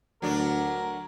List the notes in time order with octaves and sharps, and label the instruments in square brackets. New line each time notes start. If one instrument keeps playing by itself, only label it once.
[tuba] D2 [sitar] F#3 D4 [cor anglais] A#4